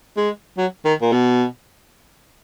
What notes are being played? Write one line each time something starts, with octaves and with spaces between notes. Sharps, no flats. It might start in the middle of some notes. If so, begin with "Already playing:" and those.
G#3
F#3
D#3
A#2
B2